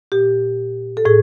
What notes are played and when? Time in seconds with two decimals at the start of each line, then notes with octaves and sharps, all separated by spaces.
0.12 A#2 G4
0.97 A4
1.05 A2 G#4